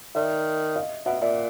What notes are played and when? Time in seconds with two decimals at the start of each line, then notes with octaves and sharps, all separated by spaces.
0.15 D#3 D5 E5
0.76 D#5 F5
1.06 B2 E5 F#5
1.21 A#2 D5 E5